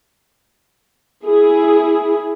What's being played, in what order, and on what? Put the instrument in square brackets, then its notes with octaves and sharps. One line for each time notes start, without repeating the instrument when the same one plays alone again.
[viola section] E4 G#4